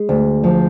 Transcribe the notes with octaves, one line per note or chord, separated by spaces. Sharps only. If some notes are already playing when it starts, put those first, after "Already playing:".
Already playing: G#3
D2
F3